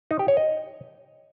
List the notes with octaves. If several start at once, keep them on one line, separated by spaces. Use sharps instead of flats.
D#4
G4
C#5
D#5